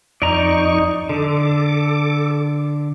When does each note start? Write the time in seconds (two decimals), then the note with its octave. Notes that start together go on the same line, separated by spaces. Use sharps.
0.22 F2 D#4 D5 D#5 A#5 C#6
1.09 D3 A4 D6